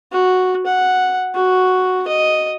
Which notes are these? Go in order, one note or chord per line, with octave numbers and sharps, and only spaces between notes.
F#4
F#5
F#4
D#5